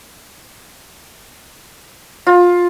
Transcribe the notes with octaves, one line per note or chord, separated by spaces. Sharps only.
F4